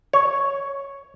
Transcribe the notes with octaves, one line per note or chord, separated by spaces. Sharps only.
C#5